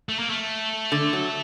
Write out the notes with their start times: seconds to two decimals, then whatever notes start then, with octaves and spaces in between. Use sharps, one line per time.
0.09 A3
0.19 A#3
0.30 A3
0.92 D3
1.13 F#3